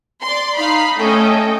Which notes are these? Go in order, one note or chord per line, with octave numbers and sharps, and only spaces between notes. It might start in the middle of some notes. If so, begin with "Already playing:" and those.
D5 C6
D#4 F5 B5 C7
A3 C#4 A4 D#5 G5